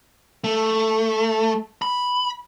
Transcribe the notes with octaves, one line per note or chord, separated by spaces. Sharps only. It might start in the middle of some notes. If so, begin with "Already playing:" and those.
A3
B5